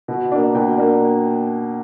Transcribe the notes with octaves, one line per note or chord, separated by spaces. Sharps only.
B2
A#3 D4
B2 G5
A#3 D4